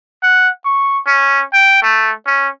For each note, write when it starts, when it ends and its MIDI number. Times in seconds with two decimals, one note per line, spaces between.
0.23 0.49 78
0.65 0.99 85
1.06 1.43 61
1.53 1.79 79
1.83 2.12 57
2.27 2.49 61